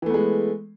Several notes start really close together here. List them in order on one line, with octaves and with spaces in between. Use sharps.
E3 A3 B3 G#3